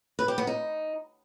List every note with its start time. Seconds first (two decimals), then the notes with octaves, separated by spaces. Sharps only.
0.19 B4
0.28 G4
0.38 B3
0.47 D#4